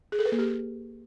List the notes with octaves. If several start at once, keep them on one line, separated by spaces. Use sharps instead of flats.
G#4
A4
B4
A#3
G4